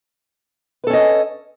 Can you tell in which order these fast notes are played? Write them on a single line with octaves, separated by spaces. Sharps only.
B4 A4 C#4 D#5